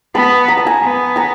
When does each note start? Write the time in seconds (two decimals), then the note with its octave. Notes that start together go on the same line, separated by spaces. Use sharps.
0.15 B3 A5 B5
0.48 A#5
0.57 A5
0.67 G#5 A#5
0.82 B3
1.16 G#5 A#5